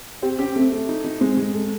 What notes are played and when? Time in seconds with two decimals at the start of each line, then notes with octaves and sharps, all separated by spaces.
0.22 C4 G4
0.39 C#4 G4
0.56 A3 C4
0.72 A3
0.89 D#4
1.04 D#4
1.21 G#3 C4
1.37 G#3
1.54 A4